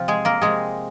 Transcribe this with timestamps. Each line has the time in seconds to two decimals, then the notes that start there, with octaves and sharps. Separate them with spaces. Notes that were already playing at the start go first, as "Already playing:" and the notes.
Already playing: C3 F3 F4
0.08 G#3 G#4
0.25 A#3 A#4
0.41 C3 F3 G#3 G#4